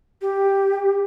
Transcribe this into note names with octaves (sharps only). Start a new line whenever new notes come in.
G4